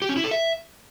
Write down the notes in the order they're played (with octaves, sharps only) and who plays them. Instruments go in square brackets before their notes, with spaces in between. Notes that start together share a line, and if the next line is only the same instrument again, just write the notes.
[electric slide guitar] G4
C#4
E4
A4
E5